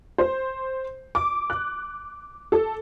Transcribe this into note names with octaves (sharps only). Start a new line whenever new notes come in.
C5
D6
F#6
A4